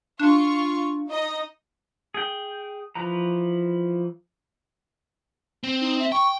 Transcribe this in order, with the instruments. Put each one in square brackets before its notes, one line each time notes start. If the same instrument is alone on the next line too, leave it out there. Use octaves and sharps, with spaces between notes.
[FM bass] D4 [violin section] F4 C#6
[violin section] D#4 D#5
[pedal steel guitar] G#4 G5
E3 F3 B4 A#5
[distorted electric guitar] C4
[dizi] D#4
E5
[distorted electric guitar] G5 [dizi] C#6